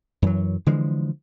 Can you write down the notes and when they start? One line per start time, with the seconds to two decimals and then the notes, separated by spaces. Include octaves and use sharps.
0.22 F#2 E3 F#3
0.66 D3 E3 F3 G#3